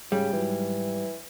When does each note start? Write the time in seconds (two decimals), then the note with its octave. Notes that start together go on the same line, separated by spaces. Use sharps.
0.12 G#2 C#3 G3
0.33 G#2 E3 F#3